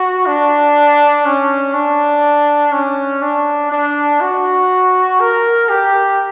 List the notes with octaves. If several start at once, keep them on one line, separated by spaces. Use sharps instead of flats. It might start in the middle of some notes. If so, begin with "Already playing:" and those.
Already playing: F#4
D4
C#4
D4
C#4
D4
D4
F#4
A#4
G4